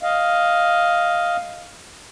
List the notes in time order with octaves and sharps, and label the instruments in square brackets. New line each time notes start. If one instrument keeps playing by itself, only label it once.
[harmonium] D#5 F5